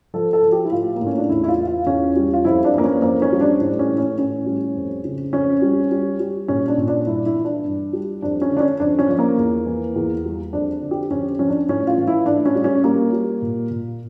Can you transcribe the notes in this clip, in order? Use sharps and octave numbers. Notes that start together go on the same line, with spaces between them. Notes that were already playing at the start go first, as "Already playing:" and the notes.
F3 A4
A4
F3
G4
E4
A2 F4
A#3
A2
C#4
D4
E2 E4
E4
F4
E3
F4
E2 C#4
G3
F4
F2 E4
D4
E3 A#3
C#4
F2 A#3
C#4
G3
D4
A2
C#4
E3
C#4
A2 C#4
G3
F2
C#3
F2 C#4
G3
G3
G3
A#2 C#4
D4
A#2
D4
G2 E4
E4
E3
D4
G2
G3
F2 D4
C#4
D3
D4
C#4
F2 D4
C#4
F3
A#3
E2
E3
E2
G3
F2 D4
D3
G4
F2 C#4
F3 C#4
D4
A2 C#4
F4
E3
E4
A2 D4
C#4
G3
C#4
G3 A#3
G3
A#2
A#2